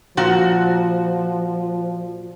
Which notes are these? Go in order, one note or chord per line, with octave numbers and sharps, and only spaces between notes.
A#2 F3 F#4